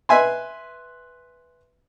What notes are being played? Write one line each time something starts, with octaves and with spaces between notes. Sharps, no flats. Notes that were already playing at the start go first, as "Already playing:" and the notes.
B4 E5 G#5 C6